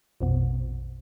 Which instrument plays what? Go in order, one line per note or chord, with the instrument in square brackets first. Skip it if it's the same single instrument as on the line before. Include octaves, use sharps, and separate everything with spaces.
[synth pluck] A#1 F2 B2